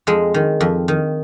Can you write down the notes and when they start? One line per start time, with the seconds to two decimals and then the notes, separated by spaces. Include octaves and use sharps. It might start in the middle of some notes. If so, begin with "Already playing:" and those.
0.07 F2 G#3
0.34 D#3
0.61 F2
0.88 D#3